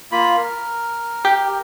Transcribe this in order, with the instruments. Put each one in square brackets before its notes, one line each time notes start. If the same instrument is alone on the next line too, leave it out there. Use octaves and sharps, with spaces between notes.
[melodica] A#3 F4 B5
A#4
[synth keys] G4